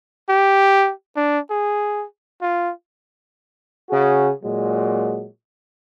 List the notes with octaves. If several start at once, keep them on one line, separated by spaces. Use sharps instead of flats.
G4
D4
G#4
F4
C#3 F#4 G#4
A#2 F#3 G#3